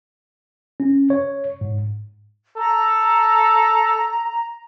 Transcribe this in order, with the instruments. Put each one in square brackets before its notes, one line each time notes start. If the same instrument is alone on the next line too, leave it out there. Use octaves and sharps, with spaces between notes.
[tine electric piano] C#4
C#5
G#2
[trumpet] A4 [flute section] A#5